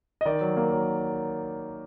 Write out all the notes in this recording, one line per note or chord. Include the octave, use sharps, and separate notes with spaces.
D#5
D#3 D5
F#3
A#3
F#3